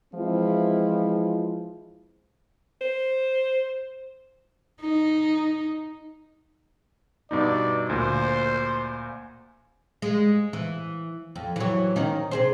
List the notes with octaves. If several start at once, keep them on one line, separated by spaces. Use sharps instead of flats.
E3 F3 G#3 C4 E4 F4
C5
D#4
G2 B2 D#4 D5
D2 A#2 C5
G#3
E3
F2
E3 F#3
D#3 C#4 D#4
C3 G#4 C5